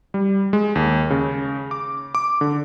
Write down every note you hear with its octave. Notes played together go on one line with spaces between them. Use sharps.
G3
G#3
D#2
C#3
D6
D6
D3